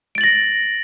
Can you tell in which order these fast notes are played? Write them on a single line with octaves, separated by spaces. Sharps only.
D7 A6 F#7 A#6